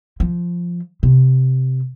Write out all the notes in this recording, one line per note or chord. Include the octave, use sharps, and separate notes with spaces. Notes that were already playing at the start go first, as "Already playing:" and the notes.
F3
C3